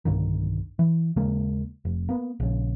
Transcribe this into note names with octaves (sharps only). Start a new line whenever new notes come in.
B1 G2 D3 D#3
E3
D#2 C#3 G#3 A#3
F1
A#3 B3
A#1 C#3